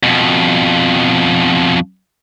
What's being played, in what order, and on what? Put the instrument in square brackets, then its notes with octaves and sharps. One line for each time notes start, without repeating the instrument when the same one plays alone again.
[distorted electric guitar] F2 B2